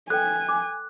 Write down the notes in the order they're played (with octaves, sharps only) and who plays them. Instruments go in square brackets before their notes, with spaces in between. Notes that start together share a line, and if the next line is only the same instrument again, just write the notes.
[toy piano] A4 B4 G5 [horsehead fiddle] G#5 [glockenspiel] F#6
[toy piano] D6